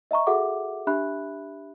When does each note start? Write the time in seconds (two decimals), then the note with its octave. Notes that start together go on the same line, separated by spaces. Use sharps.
0.11 D#5 E5 A#5 C#6
0.27 F#4 G#4 A4 E5 F#5 D6
0.87 D4 G4 E5 B5 F#6